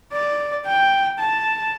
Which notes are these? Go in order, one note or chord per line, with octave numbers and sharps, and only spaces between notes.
D5
G5
A5